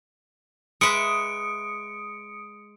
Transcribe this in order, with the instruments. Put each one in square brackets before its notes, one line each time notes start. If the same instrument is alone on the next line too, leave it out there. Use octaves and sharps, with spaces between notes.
[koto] G#3 B4 E5 [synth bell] D#6 C#7 D7